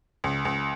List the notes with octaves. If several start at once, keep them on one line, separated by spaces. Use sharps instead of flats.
C#2
C#2